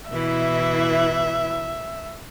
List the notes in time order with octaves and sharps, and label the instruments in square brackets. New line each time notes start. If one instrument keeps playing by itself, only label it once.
[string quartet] B2 E3 E4 [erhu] E5